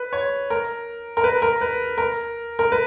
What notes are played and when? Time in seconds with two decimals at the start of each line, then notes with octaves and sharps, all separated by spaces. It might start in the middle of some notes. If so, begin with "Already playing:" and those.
Already playing: B4
0.13 C#5
0.50 A#4
1.17 A#4
1.24 B4
1.42 A#4
1.61 B4
1.98 A#4
2.59 A#4
2.72 B4